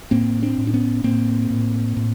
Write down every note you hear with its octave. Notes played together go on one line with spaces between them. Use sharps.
A2 A#3 C4
C4 D4
A2
D4
B3 C#4
A2 A#3 C4
A2
A2